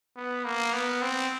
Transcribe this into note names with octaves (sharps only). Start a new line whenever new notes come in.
B3
A#3
B3
C4